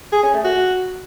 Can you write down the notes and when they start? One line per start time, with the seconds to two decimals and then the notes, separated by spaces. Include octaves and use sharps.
0.12 G#4
0.23 C#4
0.34 A3
0.44 F#4